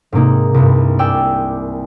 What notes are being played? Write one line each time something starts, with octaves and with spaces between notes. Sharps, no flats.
G#2 C3 A#3 D#4
C2 G2
D5 G5 G#5 E6